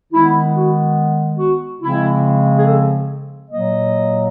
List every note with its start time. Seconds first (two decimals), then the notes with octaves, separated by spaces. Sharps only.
0.13 D#3 G#3 B3 E4
0.55 F#4
1.39 F#4
1.81 C#3 F3 G#3 C4 E4
2.58 G#4
2.65 A4
3.50 A#2 F#3 A#3 D#5